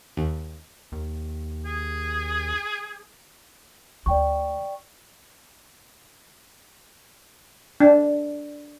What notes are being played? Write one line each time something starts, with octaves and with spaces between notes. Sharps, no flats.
D#2
D#2
G#4
D2 D5 G5 C#6
D4